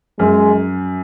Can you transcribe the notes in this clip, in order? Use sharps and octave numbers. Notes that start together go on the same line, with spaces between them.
F#2 G#3